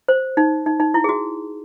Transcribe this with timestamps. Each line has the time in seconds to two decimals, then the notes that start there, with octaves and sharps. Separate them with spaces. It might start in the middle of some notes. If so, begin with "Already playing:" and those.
0.08 C5
0.37 D#4
0.66 D#4
0.80 D#4
0.94 E4
1.04 G#4
1.09 F#4